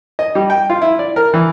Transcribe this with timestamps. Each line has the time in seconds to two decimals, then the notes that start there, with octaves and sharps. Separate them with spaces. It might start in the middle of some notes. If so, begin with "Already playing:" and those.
0.19 D#5
0.35 G3
0.50 G5
0.70 F4
0.82 E4
0.99 D5
1.16 A#4
1.34 E3